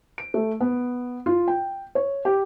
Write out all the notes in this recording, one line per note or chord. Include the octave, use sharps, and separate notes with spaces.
D7
A3
B3
F4
G5
C#5
G4